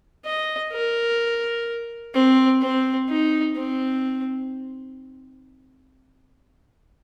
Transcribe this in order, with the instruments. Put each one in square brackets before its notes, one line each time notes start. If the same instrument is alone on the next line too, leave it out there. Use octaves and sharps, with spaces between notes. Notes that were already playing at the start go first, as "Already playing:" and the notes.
[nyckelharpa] D#5
A#4
C4
C4
D#4
C4